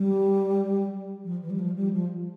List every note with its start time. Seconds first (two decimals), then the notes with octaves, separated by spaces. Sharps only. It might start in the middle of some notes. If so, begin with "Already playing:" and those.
Already playing: G3
1.24 F3
1.42 E3
1.50 G3
1.59 F3
1.76 G3
1.93 F3